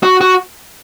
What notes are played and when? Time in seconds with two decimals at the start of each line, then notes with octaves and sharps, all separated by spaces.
0.03 F#4
0.21 F#4